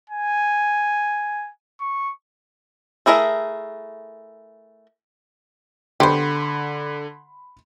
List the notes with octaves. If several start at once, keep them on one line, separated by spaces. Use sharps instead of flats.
G#5
C#6
A3 E4 G#4 A#4 E5
D3 G4 C5 B5 C6